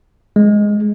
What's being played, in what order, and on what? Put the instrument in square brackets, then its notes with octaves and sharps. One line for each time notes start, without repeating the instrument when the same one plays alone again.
[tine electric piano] G#3